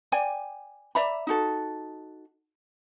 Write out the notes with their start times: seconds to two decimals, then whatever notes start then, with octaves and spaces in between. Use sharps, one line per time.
0.12 D5 G5 G#5
0.95 D5 E5 A#5 B5
1.27 D#4 F#4 A4